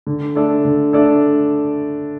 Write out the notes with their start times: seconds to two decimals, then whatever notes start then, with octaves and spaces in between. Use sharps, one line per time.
0.07 D3
0.35 A3 D4 A4 D5
0.65 D3
0.93 A3 D4 A4 D5